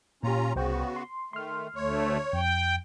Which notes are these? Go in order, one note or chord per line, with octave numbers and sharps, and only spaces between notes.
A#2 C#4 F4 G4 A#5
C2 C#3 B3 F#4 C5 G5
C6
D#3 A3 C6 F6
D2 A3 C#5
F2 G5